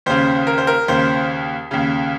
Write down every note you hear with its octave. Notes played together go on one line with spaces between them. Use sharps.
D#2 C#3 C5
A#4
C5
A#4
D#2 C#3 C5
D#2 C#3